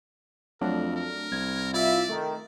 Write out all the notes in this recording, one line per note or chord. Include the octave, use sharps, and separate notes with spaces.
F2 F#3 A3 D4 A#4
A#4
C2 G#6
E4 F4 D5 E5
D#3 A3